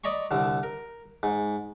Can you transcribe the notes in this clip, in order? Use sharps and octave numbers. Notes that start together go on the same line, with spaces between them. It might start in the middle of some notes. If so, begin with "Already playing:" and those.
D5 D#5 A#5 B5 C#6
C2 D3
A#4
G#2